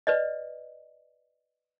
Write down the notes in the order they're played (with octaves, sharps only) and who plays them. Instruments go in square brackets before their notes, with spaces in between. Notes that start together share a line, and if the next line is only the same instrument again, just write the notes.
[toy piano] B4 D5 D#5